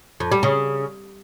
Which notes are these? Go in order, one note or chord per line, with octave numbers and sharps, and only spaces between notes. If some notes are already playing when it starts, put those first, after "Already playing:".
F2
G3
C#3